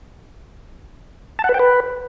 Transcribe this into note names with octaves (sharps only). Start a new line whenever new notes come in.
A5
F#5
B4
G5
B4